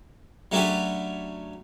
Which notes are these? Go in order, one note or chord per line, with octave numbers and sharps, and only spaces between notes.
F#3 A3 C#4 D4 G4 B4